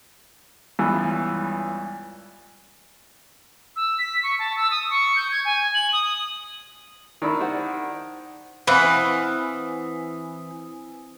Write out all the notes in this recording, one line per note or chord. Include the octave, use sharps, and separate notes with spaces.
C#2 G2 E3 B3
E6
B6
C#6
A5
E6
D#6
C#6
G6
G#6
G#5
F#7
D#6
D#3 D4 E4
C5 D5 F#5
E3 C4 B4 C5 F5 F#5 G#5 D#6